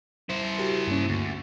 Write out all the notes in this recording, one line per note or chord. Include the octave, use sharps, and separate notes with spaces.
E4 C5
F#4 G4 A#4
G2 A#3 C#4
D2